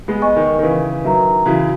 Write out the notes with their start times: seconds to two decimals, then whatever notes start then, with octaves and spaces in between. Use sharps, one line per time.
0.08 G#3 B3
0.22 D#5 G#5 C#6
0.36 D#3
0.59 D#3
0.63 C#3 E3 B4
1.05 D#3 F#3 E5 A#5
1.46 C#3 E3 F#4